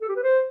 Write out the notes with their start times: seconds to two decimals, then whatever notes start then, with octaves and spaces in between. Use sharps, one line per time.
0.02 A4
0.09 G4
0.16 B4
0.23 C5